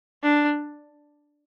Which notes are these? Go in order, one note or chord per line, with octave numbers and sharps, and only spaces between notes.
D4